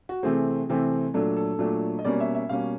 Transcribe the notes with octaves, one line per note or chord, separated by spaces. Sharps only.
F#4
C3 E3 A3 C4 G#4
C3 E3 A3 C4
A#2 F#3 A3 D4 A4
A4
A#2 F#3 A3 D4
D#5
B2 G3 A#3 C#4 D5
E5
E5
B2 G3 A#3 C#4 F5